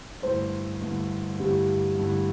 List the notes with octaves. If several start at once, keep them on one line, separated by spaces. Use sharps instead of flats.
G2 D3 A3 E4 C5
G2 D3 A3 E4
G2 D3 A3 E4 G4
G2 D3 A3 E4